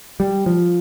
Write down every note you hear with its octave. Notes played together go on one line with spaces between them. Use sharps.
G3
F3